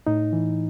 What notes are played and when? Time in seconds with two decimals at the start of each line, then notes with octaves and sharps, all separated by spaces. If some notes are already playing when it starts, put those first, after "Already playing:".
0.07 A2 D#4
0.33 E3